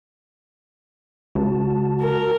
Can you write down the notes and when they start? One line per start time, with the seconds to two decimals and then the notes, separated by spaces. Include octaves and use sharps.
1.35 C#2 F#4 A5
2.01 A#4